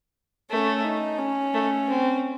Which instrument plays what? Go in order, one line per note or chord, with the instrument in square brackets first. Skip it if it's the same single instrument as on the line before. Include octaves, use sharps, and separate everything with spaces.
[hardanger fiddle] A3 [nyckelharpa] C#4
[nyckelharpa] D#4
C#4
[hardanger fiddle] A3
C4